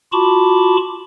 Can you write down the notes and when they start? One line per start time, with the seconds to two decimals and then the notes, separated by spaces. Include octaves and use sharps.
0.13 F4 F#4 A5 B5 C#6 D6